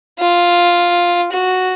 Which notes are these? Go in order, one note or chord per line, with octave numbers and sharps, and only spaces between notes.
F4
F#4